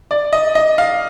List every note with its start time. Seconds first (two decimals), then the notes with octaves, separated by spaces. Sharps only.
0.11 D5
0.33 D#5
0.55 D#5
0.78 F5